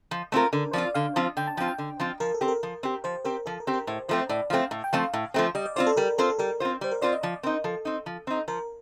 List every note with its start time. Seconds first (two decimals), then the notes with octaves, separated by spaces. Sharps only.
0.11 F3
0.32 A3 C4 F4 A#4
0.53 D3 A#4
0.73 F3 C4 F4 D5
0.95 D3 F5
1.16 F3 C4 F4
1.37 D3 G5
1.47 A5
1.57 F3 C4 F4 G5
1.68 G5
1.78 D3
2.00 F3 C4 F4
2.20 F3 A#4
2.34 A4
2.41 C4 G4
2.48 A#4
2.63 F3
2.83 C4 G4
3.04 F3 C5
3.25 C4 G4 A#4
3.46 F3 A4
3.60 A#4
3.67 C4 G4
3.73 A#4
3.87 A2 C5
4.09 F3 A3 C4 C5
4.29 A2 D5
4.50 F3 A3 C4 F5
4.71 A2
4.84 G5
4.93 F3 A3 C4 F5
5.13 A2
5.34 F3 A3 C4
5.55 G3 D#5
5.66 D5
5.76 C4 F4 C5 D5
5.87 A4
5.97 G3 A#4
6.18 C4 F4 A4 C5
6.30 A4
6.39 G3 A#4
6.60 C4 F4 C5
6.81 G3 C5
6.91 A#4
7.02 C4 F4 C5 D5
7.12 D#5
7.23 F3 D5
7.43 C4 D#4 A#4
7.64 F3 A4
7.85 C4 D#4
8.06 F3
8.27 C4 D#4
8.48 F3 A#4